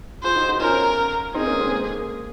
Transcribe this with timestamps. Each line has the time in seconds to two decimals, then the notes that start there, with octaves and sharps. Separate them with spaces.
0.23 F4 G#4 C5
0.35 D#4 F#4
0.48 D#4 F#4
0.61 C#4 F4 A#4
1.34 C4 D#4 G#4
1.47 A#3 C#4
1.60 G#3 C4
1.72 A#3